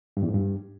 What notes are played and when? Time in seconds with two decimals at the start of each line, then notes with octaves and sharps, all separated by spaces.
0.17 G2
0.23 E2
0.28 G#2
0.34 G2